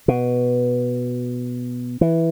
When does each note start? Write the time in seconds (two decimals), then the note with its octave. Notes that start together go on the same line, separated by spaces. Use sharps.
0.08 B2
2.01 E3